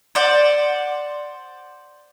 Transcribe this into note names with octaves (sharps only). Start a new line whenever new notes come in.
C5 D5 F#5